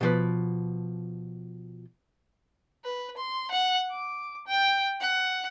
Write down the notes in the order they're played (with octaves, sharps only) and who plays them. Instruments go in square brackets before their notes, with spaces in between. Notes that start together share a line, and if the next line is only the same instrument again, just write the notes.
[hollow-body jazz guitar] B2 F3 B4
[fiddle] B4
C6
F#5
D6
G5
F#5